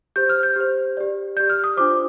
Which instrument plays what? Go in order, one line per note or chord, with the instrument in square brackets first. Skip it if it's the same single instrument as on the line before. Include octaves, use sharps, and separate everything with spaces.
[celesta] G4 C5 G6
F6
G6
G4 C5
G4 D5
D5 G6
G4
F6
D#6
D4 F4 C5 D6